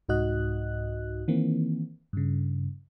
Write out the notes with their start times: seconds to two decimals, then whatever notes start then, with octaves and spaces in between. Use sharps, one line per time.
0.09 C2 G#2 D#4 F#4 D#5 F#6
1.28 D#3 E3 A#3 C4
2.13 G2 C#3